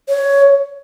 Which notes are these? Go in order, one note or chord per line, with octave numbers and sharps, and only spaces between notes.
C#5